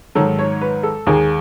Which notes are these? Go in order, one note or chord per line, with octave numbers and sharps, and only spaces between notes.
G#2 D#3 F#3 A4
C#5
B4
A4
D#2 D#3 G#3 G#4